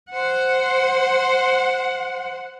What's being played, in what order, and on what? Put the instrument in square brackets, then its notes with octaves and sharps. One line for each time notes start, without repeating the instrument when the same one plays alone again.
[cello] C5 F#5